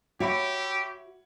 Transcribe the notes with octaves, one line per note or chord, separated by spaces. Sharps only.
F#4 G4 C#5 E5 B5